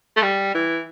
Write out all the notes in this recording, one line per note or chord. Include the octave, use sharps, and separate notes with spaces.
A3
G3
E3